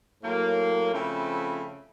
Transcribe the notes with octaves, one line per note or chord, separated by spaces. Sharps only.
A2 F#3 A#3
C#3 F3 A3 C4 E4